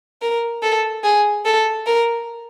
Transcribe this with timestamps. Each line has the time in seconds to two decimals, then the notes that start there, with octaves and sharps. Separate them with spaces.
0.22 A#4
0.63 A4
1.04 G#4
1.46 A4
1.86 A#4